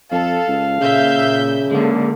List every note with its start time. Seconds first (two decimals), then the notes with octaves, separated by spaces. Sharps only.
0.11 F2 A4 F5
0.48 C#2
0.81 A#2 C#3 E5 G6
1.71 D3 G#3 A#3